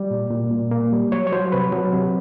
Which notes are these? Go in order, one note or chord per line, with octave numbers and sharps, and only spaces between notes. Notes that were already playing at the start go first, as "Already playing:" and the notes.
Already playing: G3 D5
A#2
A#2
A#2
A#3
G3
F#3 C#5
C#5
F#3 C5
C3 B4
F#3
C3